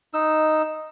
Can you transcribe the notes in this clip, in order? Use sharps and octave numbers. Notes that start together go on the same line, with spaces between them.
D#4 E6